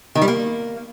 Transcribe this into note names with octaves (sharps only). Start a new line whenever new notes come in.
D#3
G3
A#3